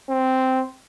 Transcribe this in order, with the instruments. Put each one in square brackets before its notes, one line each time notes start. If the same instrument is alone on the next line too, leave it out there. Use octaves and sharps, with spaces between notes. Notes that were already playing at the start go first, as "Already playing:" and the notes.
[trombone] C4